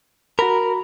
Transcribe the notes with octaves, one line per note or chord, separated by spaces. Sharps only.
F#4 A#4 A#5 B5